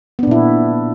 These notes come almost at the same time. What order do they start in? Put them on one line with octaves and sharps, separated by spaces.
B3 D4 A#2 E4